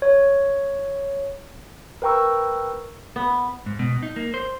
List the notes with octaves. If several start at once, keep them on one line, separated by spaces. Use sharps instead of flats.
C#5
A#4 B4 G5 A#5 C#6 E6
B3
G#2
B2
D#4
A#3
C5